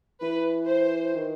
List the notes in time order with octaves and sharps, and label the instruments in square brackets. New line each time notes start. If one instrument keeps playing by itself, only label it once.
[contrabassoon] E3 [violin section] B4
[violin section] C5
[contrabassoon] D#3